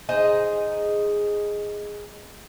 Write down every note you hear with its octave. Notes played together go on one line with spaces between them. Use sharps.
D#4 G#4 C5 D#5